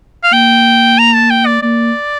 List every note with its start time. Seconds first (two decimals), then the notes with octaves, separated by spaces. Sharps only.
0.23 F5
0.33 A#3 G5
0.98 A#5
1.15 A5
1.30 G5
1.46 D5
1.62 A#3 D5